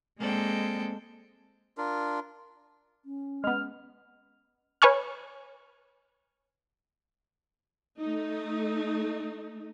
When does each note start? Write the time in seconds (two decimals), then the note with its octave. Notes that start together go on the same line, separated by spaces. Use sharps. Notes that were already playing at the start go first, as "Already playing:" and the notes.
0.21 G#3 A#3 C4 A4 D5 G5
1.77 D4 F4 A#4
3.05 C#4
3.44 G#3 B3 F6
4.82 B4 C#5 G#5 C#6 F6
7.99 A3 D#4